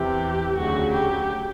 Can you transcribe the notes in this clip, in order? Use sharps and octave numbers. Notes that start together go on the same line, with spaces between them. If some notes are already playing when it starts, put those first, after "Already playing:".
Already playing: E2 C3 E3 G4
D2 C#3 F#3 F#4
G4